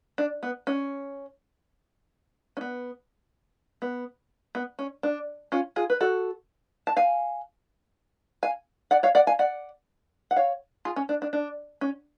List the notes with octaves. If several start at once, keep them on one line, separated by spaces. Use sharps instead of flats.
D4
B3
C#4
C#4
B3
B3
B3
C#4
D4
C#4 F4
F4 G#4
B4
F#4 A4
A5
F5 G#5
F5 G#5
D5 F#5
C#5 F5
D5 F#5
F5 G#5
D5 F#5
F#5
C#5 F5
F4 G#4
C#4
D4
D4
D4
C#4